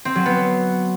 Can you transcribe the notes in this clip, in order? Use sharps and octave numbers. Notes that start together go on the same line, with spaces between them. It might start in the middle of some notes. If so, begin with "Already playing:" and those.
C4
F#3
B3